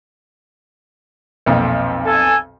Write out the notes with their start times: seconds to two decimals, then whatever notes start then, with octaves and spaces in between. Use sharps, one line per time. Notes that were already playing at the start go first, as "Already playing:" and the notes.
1.46 B1 F2 A#2
2.05 A4 G#5